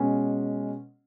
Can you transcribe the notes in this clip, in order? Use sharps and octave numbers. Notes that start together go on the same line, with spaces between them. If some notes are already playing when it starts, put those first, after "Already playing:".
Already playing: B2 G#3 C#4